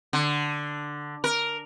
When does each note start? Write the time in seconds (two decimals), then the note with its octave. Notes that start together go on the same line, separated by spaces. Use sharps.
0.13 D3
1.24 A#4